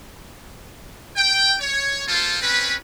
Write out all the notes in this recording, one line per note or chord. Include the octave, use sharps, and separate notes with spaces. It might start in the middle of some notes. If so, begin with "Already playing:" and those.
G5
C#5
A#3 F4 A4 C5
C4 C#4 B4